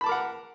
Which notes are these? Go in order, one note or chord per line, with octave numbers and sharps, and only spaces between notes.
A#4 F#5 A5 B5 D6